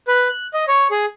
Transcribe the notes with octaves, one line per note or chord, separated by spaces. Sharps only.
B4
F#6
D#5
C#5
G#4